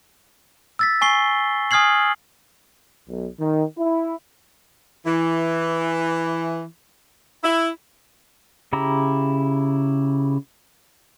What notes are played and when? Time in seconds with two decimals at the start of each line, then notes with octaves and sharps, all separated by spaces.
0.79 E6 A6 B6
1.01 G#5 C#6 C7 G7
1.71 G#5 D#6 F6 G#6 C7 F#7
3.08 B1
3.40 D#3
3.78 E4
5.06 E3
7.44 E4
8.73 C#3 E4 G4 A#5